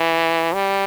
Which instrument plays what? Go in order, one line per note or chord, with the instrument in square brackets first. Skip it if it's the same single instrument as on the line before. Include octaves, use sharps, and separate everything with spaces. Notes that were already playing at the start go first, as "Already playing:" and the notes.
Already playing: [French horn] E3
G3